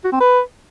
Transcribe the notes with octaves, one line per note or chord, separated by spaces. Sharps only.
F#4
C4
B4